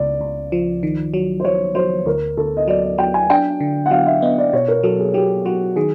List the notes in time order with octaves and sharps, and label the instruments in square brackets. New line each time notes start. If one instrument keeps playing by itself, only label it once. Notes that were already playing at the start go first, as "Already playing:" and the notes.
Already playing: [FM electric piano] C#2 C#3 [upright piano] D5
[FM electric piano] C#2
F3
D#3
F#3
[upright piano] C5
[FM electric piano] F#3 [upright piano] C#5
[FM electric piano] F#3 [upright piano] C5
[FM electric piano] D2 [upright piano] A#4
[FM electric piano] D2 [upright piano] A4
[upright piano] D#5
[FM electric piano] F#3 [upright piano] D5
[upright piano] D5
[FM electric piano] F#3 [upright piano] G5
[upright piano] G#5
[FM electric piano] D4 [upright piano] G5
[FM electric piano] D3
[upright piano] F#5
[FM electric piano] F#3 [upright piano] F5
[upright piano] E5
[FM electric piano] B3 [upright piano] D#5
[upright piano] D5
[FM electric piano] B2 [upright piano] C#5
[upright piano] A#4
[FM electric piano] F#3 [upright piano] A4
[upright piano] G#4
[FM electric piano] F#3 [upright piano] G4
[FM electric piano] F#3 [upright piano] F#4
[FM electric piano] D#3 [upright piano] G#4